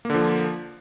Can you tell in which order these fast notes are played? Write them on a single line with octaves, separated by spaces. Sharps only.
A#3 D3 F3